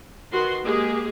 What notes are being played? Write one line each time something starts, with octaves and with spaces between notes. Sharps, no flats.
D#3 F#4 B4 C6
G#3 A#3 G4 G#4